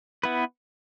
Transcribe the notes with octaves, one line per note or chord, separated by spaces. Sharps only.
B3 E4 B4